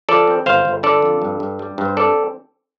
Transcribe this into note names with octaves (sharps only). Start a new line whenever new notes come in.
F3 A4 D5
C4
G1 C5 F5
G1
D3 A4 D5
F2
G2
G2
G3
G2
C5
C4 A4 D5